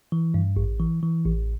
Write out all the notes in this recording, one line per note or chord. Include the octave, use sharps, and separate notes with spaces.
E3
G2
A1
E3
E3
A1